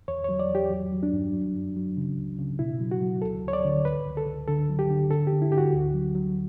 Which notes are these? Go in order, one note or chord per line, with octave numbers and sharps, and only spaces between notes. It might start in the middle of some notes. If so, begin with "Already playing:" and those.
E2 C#5
F#3 C#5
D5
E2
G4
F#3
F#3
D4
G2
F#3
F#2
F#3
C#3
C#2
C#3
B2 E4
F#3
F#4
F#3
D2 A4
D2 C#5
D5
D3
C#2 B4
C#2
A4
C#2
D3 A4
F#3
G4
D3
D3 A4
G4
D3
E4
D3 G4
F#4
D2
F#3
F#3